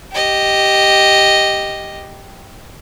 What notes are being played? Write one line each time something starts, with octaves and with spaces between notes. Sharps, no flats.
G4 D#5